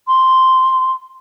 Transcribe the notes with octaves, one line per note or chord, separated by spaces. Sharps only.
C6